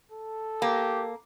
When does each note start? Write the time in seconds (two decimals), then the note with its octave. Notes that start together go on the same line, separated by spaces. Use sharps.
0.12 A4
0.62 A#3 G4